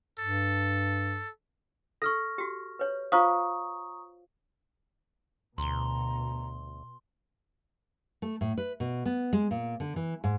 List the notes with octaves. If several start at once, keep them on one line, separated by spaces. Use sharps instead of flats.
G2 A4
A4 C#6 F6 A#6
F#4 G4
B4 C#5
F4 C5 F5 A#5 C#6 D#6
D2 B2 A#5 C6 G7
A3
A2
B4
B2
B3
G#3
A#2
D3
E3
G#2